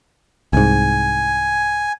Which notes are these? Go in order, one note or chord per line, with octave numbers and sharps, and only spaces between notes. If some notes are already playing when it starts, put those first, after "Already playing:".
C2 G#2 G#5